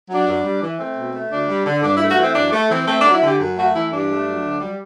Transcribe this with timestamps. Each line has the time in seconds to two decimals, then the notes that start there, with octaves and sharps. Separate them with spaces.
0.09 F#3 D4
0.26 F#2
0.43 G3
0.61 E3
0.78 A3 C4
0.96 B2
1.14 A3
1.31 D2 D4
1.48 G3
1.65 D3
1.83 G2 D4
1.96 E4
2.00 A3
2.09 F#4
2.17 E3 C4
2.35 F#2 D4
2.52 A3
2.69 E3 C4
2.87 A3 C4
3.00 D4
3.05 F#3
3.13 E4
3.21 D3 G4
3.39 F#2
3.56 A3 F#4
3.74 E3 E4
3.91 G2 D4
4.09 A3
4.26 F#3
4.43 D2
4.61 G3